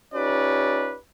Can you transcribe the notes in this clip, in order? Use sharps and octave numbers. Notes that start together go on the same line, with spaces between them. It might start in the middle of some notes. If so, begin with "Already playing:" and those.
C#4 D#4 F4 G4 B4 D5